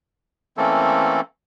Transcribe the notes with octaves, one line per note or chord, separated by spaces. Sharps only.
E3 A3 A#3 C4 C#4 A4